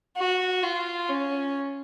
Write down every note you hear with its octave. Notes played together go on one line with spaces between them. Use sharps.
F#4
F4
C#4